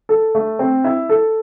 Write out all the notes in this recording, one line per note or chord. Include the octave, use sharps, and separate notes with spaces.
A4
A3
C4
E4
A4